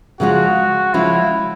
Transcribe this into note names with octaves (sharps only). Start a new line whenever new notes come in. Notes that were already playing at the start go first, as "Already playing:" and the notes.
C#3 F3 G#3 C#4 F4 F#4
C#3 F3 G#3 C#4 E4 F4